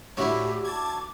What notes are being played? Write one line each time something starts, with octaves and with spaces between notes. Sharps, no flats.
A2 D3 C#4 E4 F#4 G4 E5
A5 D6 G#6